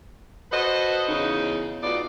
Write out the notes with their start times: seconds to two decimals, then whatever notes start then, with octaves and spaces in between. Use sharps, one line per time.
0.52 F#4 A4 B4 C5 D#5
1.08 E2 C#3 D#4
1.83 A2 B3 D#4 F4 F#4 D5